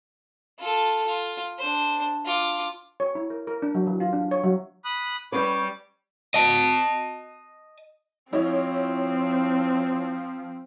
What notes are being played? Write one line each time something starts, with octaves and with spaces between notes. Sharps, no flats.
F4 A4
F4
D4 C5
F4 D6
C#5
E4
A#4
A#4
D4
F#3
E3
F4
D4
C#5
F#3
B5 D#6 F#6
G3 C#4 B4 C#5 D6
D#5 A5
F3 C4 E4 C#5 D#5